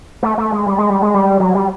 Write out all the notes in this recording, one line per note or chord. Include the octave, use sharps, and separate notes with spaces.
A3
A3
G#3
G3
G#3
G3
G#3
G3
F#3
G3